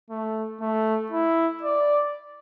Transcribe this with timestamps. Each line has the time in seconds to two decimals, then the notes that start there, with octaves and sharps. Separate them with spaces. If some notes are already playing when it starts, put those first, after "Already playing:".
0.10 A3
0.61 A3
1.12 E4
1.63 D5